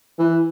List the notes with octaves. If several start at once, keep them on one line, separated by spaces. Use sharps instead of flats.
E3